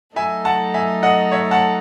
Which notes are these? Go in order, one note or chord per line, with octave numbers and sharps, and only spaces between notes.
F#3 A3 D#4 A4 E5 G#5
F#5 A5
E5 G#5
D#5 F#5
C#5 E5
F#5 A5